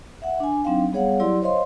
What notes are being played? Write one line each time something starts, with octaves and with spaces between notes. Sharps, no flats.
E5 F#5
D4 G#5
F#3 C4 D4 D#4 F5 G5
G3 B3 G#4 C#5 F5 F#5
F#3 E4 G4 D5 C6
C5 C#5 D#5 F5 C6